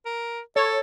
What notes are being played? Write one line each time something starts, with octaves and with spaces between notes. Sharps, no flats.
A#4
A4 C#5